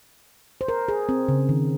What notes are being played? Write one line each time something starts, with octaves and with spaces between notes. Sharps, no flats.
C5
A#4
G#4
C4
C#3
D#3